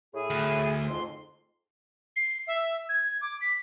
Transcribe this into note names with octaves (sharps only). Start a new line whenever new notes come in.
A2 E4 G#4
D2
F2 G#2 C6
C7
E5
G#6
D6
B6